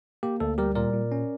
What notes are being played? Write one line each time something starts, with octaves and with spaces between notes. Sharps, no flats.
A#3 G4
D2 A4
G3 G4 A#4
A#2 A#4 D5
A#2
C#4